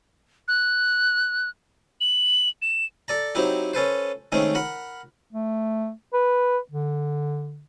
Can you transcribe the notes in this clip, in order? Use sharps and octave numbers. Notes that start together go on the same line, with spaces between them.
F#6
F#7
E7
A4 D5 A#5
F#3 C4 D#4 E4 G4
C#4 A4 B4 C5
D#3 G#3 A3 C4 C#4
A#4 F#5 B5
A3
B4
D3